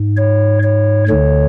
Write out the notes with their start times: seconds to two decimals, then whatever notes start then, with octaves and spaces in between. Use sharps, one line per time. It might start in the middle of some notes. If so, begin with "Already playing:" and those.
Already playing: G#2
0.17 C#5
0.63 C#5
1.08 D2 D3 C#5